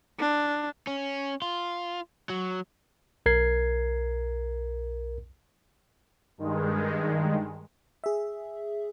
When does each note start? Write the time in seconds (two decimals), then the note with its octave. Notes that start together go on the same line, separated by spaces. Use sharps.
0.19 D4
0.87 C#4
1.42 F4
2.30 F#3
3.26 B1 A#4 G#6 C7
6.38 G2 D#3 G#3
8.04 G#4 E5